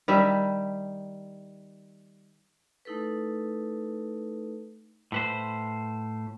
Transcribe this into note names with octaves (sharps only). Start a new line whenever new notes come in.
D#3 G3 E5
A3 D#4 E4 A4 B4
A2 B4 C5